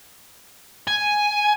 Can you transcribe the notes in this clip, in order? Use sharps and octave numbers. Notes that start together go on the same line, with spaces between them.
G#5